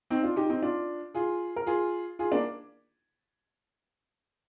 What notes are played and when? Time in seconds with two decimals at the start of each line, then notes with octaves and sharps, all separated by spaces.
0.10 C4 D#4
0.23 D4 F4
0.36 D#4 G4
0.49 C4 D#4
0.62 D4 F4
1.14 F4 G#4
1.56 A#4
1.67 F4 G#4
2.19 F4 G#4
2.32 A#3 D4